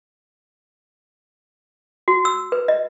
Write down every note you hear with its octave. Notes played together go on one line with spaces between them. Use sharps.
F#4
E6
B4
D#5